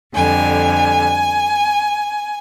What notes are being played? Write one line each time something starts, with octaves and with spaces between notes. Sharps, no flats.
F2 D3 G3 G#5